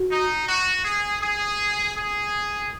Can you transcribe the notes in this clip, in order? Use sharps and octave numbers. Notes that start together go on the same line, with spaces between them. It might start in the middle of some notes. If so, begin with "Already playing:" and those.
Already playing: F#4
D#4
F#4
G#4
G#4
G#4